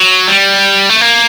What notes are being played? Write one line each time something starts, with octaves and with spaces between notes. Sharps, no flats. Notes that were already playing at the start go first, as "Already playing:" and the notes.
Already playing: F#3
G3
A3
A#3